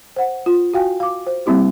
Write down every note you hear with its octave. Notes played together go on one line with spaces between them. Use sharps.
C5 F#5
F4
F#4 F5 G5 G#5
F5 D6
C5
G3 A#3 C4 E4 G4